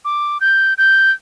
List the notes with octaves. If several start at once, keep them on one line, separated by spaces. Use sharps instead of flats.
D6
G6
G6